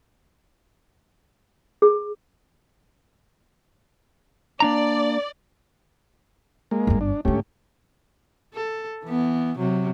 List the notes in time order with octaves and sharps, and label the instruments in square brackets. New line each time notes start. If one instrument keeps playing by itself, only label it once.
[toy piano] G#4
[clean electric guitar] A#3 D4 A#5 [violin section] D5
[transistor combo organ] G#3 A#3
[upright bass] G1 G2
[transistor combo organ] D4
[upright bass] G#2 D3 [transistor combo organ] A3 C#4 G4
[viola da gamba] A4
E3 B3
C3 F#3